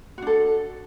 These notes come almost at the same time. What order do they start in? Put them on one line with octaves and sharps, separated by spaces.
F#4 D4 A4